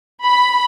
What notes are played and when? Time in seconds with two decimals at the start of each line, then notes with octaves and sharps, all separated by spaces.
0.25 B5